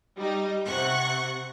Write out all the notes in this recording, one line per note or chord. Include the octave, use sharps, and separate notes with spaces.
G3 D#4
C3 F#5 C#6 F#6